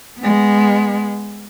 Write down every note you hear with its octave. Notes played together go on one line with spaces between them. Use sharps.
G#3 B3